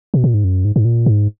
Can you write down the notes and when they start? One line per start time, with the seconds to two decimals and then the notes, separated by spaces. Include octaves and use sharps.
0.14 B2
0.24 A#2
0.34 G#2
0.44 F#2
0.65 G#2
0.76 G#2
0.85 A#2
1.06 G#2